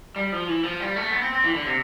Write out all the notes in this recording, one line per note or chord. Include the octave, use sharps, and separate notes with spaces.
G3
F3
E3
F3
G3
A3
B3
C4
C4
E3
D3
C3